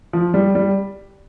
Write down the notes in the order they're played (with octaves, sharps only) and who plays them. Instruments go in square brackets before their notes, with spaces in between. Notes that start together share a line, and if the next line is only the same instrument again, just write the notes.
[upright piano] F3
G3
G3